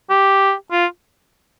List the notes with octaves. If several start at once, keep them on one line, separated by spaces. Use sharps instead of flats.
G4
F4